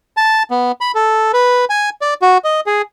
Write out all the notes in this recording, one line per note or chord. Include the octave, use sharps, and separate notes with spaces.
A5
B3
B5
A4
B4
G#5
D5
F#4
D#5
G#4